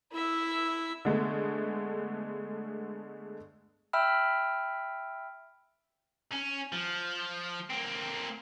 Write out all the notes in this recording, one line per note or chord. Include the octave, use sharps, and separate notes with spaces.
E4 E5
D3 G#3 A3 B3
E5 G5 B5 E6 F6
C#4
F3
A#3 C4